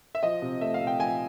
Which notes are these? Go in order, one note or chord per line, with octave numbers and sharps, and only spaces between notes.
E5
F3 D#5
C3
A3 E5
F5
C3
G5
F3 G#5